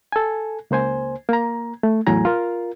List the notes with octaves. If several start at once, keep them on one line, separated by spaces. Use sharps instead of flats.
A4 G#5
C#2 A#3 C5 G#5
A#3 A#5
A3
E2 A2 F#3 G#5 A#5
F4 A#4